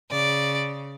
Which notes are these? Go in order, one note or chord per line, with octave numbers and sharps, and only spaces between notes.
C#3 D5